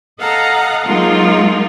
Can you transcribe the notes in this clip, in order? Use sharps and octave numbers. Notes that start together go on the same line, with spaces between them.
A4 D#5 F5 F#5 A#5
F#3 G#3 A#3 D#4 F4